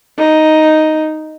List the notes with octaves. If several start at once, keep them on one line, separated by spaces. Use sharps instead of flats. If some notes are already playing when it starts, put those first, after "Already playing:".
D#4